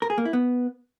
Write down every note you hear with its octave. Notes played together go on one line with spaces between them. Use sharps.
A#4
G#4
A#3
E4
B3